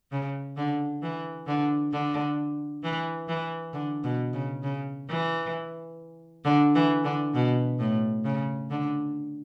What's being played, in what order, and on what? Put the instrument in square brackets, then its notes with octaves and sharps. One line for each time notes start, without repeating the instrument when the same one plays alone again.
[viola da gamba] C#3
D3
E3
D3
D3
E3
E3
D3
B2
C#3
C#3
E3
D3
E3
D3
B2
A2
C#3
D3